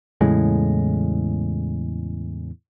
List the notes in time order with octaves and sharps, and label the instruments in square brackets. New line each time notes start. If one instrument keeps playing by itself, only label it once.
[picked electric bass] E2 A2 C#3 G#3